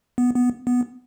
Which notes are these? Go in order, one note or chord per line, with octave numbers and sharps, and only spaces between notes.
B3
B3
B3